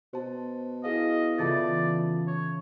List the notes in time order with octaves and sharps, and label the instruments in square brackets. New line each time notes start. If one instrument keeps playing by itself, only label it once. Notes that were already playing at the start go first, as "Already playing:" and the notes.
[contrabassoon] B2 [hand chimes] C5 A5
[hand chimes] E4 G#4 F5 [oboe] D#5
[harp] C#3 E3 [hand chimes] F4 A4 A5 [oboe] D5
[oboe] C#5